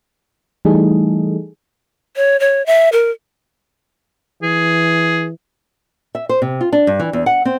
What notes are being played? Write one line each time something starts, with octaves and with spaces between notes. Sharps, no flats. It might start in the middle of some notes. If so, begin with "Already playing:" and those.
E3 G3 A3 D#4 G#4 A4
C#5
C#5
E5
A#4
E3 G#4
E5
C5
C3
F4
D4
G2
E3
E2
F#5
C4